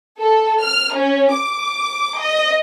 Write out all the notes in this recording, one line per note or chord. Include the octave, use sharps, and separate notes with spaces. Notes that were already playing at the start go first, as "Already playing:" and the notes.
A4
F6
C#4
D6
D#5